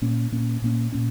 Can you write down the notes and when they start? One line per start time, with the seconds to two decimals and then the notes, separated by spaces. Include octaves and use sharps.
0.02 A#2 A#3 C#4
0.32 A#2 A#3 C#4
0.62 A#2 A#3 C#4
0.92 A#2 A#3 C#4